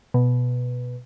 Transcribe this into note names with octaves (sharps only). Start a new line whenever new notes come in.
B2